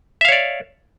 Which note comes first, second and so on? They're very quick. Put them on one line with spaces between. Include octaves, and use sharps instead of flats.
E5 F5 C#5 D5